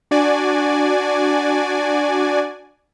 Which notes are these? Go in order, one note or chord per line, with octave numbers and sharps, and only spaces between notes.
D4 F#4 D5 G#5